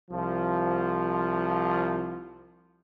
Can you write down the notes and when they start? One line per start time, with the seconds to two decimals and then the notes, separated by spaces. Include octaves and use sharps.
0.11 C2 F3